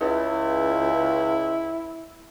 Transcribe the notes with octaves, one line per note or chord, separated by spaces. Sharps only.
C#2 E4